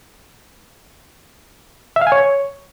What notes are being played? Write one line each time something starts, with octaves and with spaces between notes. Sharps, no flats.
E5
F5
G#5
C#5